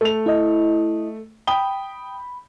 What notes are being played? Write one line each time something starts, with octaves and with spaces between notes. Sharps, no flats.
A3 F7
E4 D#5
G5 B5 D#6 G7